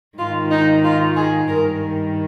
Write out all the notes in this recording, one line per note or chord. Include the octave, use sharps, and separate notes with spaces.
G#2 D#3 F4
D#4
F4
G#4
G2 D#3 A#4